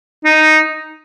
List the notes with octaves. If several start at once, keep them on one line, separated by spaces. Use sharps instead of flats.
D#4